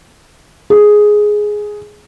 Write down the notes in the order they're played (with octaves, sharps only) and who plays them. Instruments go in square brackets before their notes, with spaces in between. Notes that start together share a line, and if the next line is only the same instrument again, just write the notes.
[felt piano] G#4